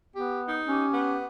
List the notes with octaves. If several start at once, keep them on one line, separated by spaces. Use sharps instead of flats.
B3 G4
D#4
C#4 G4
B3